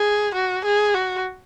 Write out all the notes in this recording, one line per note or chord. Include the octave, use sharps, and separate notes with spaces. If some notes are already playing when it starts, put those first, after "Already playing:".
Already playing: G#4
F#4
G#4
F#4